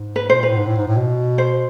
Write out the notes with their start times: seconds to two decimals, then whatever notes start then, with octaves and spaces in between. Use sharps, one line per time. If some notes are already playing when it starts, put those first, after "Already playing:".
Already playing: G#2
0.16 B4
0.30 B2 C5
0.39 A#2 B4
0.49 A2
0.56 G#2
0.66 A2
0.77 G#2
0.87 A2
0.97 B2
1.38 C5